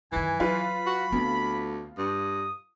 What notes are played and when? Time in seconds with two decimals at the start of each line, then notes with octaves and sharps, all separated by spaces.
0.12 F#2 D#3 E3 G#5
0.40 F#3 F4 B4 B5
0.86 F#4
1.12 D2 B3 C4
1.98 G2 D#6